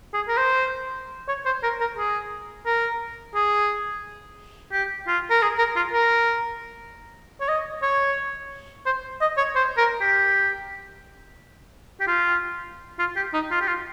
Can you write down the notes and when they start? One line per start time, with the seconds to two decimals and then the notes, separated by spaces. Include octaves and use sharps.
0.14 G#4
0.28 A#4
0.37 C5
1.28 C#5
1.46 C5
1.63 A#4
1.80 A#4
1.98 G#4
2.66 A#4
3.35 G#4
4.72 G4
5.07 F4
5.30 A#4
5.42 G#4
5.58 A#4
5.76 F4
5.93 A#4
7.41 C#5
7.48 D#5
7.82 C#5
8.86 C5
9.21 D#5
9.37 C#5
9.55 C5
9.77 A#4
10.01 G4
12.00 G4
12.07 F4
12.99 F4
13.16 G4
13.33 D#4
13.51 F4
13.61 G4
13.67 F4